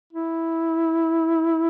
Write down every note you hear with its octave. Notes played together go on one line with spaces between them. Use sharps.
E4